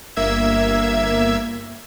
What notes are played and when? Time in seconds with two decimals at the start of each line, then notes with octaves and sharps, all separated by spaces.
0.16 G1 A#3 E5 E6 G#6